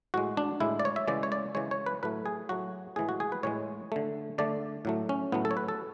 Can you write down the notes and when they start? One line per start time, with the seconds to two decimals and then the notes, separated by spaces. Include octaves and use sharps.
0.14 A2 G#3 F#4
0.37 D4
0.60 A2 G#3 E4
0.79 D5
0.85 C#5
0.96 E5
1.07 C#3 E3 G#3 D5
1.23 C#5
1.32 D5
1.55 C#3 E3 G#3 C#5
1.71 C#5
1.86 B4
2.03 A2 F#3 A3 B4
2.26 G#4
2.49 A2 F#3 A3 F#4
2.96 A2 E3 G#3 G#4
3.09 F#4
3.20 G#4
3.32 B4
3.43 A2 E3 G#3 C#5
3.92 D3 A3
4.38 D3 A3 D5
4.85 A2 F#3 A3
5.09 C#4
5.32 A2 F#3 A3 B3
5.45 A4
5.51 C#5
5.57 B4
5.68 A4